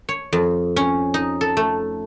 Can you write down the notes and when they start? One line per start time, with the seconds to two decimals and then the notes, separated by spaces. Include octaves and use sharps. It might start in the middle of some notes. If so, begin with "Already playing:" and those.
0.09 C#5
0.33 F2
0.76 C#4
1.14 D#4
1.41 A4
1.57 A3